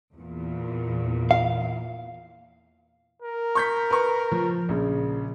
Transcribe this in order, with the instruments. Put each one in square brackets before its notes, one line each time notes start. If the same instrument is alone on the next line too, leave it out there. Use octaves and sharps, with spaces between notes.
[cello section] E2 A#2
[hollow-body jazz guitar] F5
[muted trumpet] A#4
[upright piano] C#6 G6 B6
B4 C#6
F3
A#1 C#3